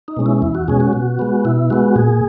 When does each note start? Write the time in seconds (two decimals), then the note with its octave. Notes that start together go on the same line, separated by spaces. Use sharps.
0.08 D#4
0.17 B2 G#3 C#4
0.26 E4
0.42 E2 E4
0.55 F#4
0.68 B2 G#3 C#4 G#4
0.80 F#4
0.93 B2
1.19 G#3 B3
1.45 B2 E4
1.70 G#3 B3 F#4
1.96 A#2 G#4